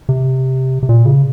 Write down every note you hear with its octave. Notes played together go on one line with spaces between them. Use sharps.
C3
C3
A#2
C#3